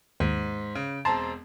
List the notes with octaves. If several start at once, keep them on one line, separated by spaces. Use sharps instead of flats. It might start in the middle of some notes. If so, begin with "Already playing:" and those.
D#2 G#2
C#3
E1 C4 A5 A#5 C6